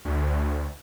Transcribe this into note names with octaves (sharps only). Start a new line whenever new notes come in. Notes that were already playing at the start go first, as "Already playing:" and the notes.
D2